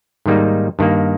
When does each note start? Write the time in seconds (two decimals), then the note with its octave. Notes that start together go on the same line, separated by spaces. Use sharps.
0.26 G#2 D#3 G3 A#3 D#4
0.79 G2 D#3 A#3